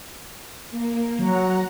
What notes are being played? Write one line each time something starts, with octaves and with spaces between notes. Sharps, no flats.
A#3
F#3 F#5 A#5